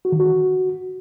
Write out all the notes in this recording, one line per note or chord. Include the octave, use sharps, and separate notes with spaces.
F#4
D#3
F#4